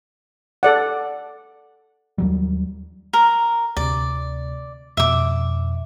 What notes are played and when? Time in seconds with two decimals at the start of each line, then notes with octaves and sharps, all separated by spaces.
0.63 A4 D5 F#5
2.18 D#2 F#3 G3
3.13 A#4
3.77 D2 C3 D5
4.97 F2 B2 E5 D6